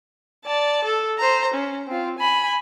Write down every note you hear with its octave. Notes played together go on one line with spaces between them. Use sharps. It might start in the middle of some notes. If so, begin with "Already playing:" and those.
D5 A5
A4
C5 A#5
C#4
C4 F4
G#5 B5